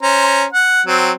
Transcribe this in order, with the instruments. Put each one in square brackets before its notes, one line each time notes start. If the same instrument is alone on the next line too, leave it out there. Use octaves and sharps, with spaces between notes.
[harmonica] C#4 C5 A#5
F#5
F#3 C4